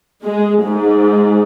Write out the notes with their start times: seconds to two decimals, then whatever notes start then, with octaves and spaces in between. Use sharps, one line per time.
0.24 G#3
0.66 G#2